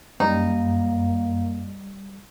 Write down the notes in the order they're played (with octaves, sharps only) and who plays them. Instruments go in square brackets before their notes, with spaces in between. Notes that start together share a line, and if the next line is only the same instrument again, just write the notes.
[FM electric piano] F#2 [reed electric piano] G3 [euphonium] A#3 [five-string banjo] D#4